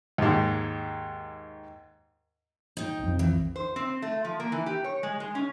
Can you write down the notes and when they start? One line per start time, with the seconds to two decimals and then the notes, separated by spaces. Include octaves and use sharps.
0.18 D#2 G#2
2.77 D#4 G5
2.99 B1 F2
3.19 E3
3.56 C5
3.76 C4
4.02 A3
4.25 F3
4.40 A#3
4.52 E3
4.66 G4
4.84 C#5
5.03 G#3
5.20 G#3
5.35 C#4